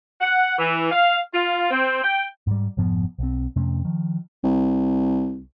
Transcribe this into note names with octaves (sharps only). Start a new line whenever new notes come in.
F#5
E3
F5
F4
C4
G5
G#2 G3
F1 G#2 F3 B3
B1 C4
F2 C3 A3 C#4
D#3 F3
C2